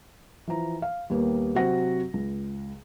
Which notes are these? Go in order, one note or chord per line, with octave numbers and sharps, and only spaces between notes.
E3 F3 A#5
F5
D#2 G3 A#3 B3
C3 F#3 C4 F#4 F#5 A#6
C#2